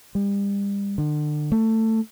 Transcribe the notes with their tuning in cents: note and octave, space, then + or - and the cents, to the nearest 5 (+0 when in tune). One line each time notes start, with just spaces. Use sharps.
G3 +35
D3 +35
A3 +20